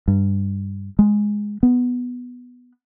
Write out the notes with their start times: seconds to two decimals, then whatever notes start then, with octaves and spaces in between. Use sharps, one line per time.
0.08 G2
0.99 G#3
1.63 B3